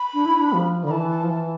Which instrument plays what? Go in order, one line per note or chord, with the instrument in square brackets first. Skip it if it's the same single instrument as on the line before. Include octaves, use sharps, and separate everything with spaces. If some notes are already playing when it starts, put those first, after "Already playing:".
Already playing: [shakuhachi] B5
[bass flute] D4
E4
D4
F3
[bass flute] D3 [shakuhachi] B5
[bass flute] E3 [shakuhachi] A5
[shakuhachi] A5
[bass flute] F3
[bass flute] E3 [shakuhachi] A5